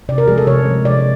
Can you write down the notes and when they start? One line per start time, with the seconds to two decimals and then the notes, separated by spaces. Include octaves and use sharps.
0.09 C3 D5
0.18 A#4
0.28 F3 G#3 G#4
0.38 A4
0.47 C3 C#5
0.66 F3 G#3
0.85 C3 D5